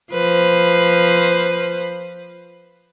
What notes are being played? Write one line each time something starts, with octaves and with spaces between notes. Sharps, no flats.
F3 B4 C5